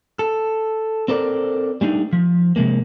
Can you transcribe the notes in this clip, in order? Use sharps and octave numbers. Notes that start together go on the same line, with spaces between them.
A4
C4 A4 A#4 D5
G3 A3 D4 D#4
F3
C3 F3 G#3 A#3